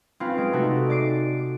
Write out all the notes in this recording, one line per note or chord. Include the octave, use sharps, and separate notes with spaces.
C4 C#4 F4 B4
G#3 D7
C3 A3 D#4 F#4 A4
D5 D6 C7 D7